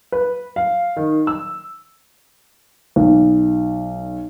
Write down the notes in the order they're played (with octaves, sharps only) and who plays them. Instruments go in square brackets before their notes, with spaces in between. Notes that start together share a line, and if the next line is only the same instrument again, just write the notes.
[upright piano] B4
F5
D#3
E6
[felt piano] B1